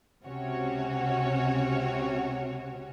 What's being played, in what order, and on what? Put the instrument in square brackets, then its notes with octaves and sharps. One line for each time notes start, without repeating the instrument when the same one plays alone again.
[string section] C#2 C3 C#4 F#4 C#5